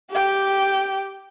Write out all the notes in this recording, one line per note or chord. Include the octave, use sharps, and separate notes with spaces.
G4 G5